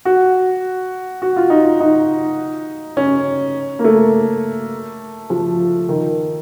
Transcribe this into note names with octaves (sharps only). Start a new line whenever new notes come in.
F#4
F#4
F4
D#4
F4
D#4
C#4
A#3
A3
F3
D#3